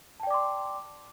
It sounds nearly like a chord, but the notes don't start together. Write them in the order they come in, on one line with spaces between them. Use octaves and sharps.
A5 G5 D5 D6 C6